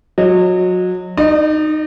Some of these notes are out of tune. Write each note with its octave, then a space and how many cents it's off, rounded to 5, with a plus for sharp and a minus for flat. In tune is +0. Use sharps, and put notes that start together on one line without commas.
F#3 -25 D#5 -20
D#4 -10 D5 +40